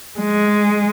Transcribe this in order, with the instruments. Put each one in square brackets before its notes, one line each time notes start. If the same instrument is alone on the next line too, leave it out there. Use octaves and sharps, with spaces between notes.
[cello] G#3